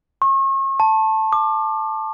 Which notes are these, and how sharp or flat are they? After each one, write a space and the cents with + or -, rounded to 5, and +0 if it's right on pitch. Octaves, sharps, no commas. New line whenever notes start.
C#6 -40
A5 +0
D6 +30